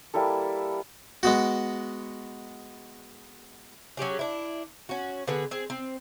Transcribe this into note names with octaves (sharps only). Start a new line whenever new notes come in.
G3 A#3 E4 A4
G#3 B3 F#4
F#3 C#4 G4 G#4
D4 E4
C#4 F#4
D3 B3 G#4 B4
C4 G#4
C4